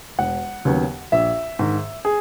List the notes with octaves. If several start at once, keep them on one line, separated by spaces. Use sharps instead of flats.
E1 F#5
D#2 C#3 F#3 B3
A#1 E5
G#2 D#3
G#4